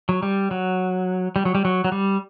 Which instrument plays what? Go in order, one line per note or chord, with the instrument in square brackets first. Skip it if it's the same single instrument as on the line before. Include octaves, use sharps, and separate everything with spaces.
[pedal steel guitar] F#3
G3
F#3
G3
F#3
G3
F#3
F#3
G3